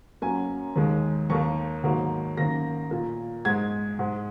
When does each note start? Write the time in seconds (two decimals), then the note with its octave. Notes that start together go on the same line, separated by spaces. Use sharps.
0.22 F#2 F#3 A#3 G#5
0.76 D#2 D#3 G#3
1.30 D#2 D#3 A#3 C#6
1.84 G#2 D#3 F#3 A#3
2.37 F#2 D#3 A#3 A#6
2.91 A#2 A#3
3.45 G#2 G#3 G#6
3.99 G#2 G#3